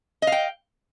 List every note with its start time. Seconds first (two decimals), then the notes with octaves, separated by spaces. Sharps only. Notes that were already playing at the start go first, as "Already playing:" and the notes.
0.22 D#5
0.27 F5
0.32 G5